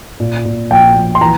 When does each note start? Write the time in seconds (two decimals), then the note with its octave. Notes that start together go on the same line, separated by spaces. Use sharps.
0.20 A#2
0.45 A#2
0.71 A#1 G5
0.96 A#1
1.15 C6
1.21 E3 A#5